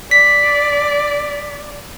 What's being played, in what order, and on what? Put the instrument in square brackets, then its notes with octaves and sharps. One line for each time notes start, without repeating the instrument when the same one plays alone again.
[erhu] D5 [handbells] B6